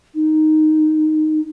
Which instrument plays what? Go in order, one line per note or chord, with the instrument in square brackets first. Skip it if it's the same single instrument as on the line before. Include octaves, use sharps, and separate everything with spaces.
[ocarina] D#4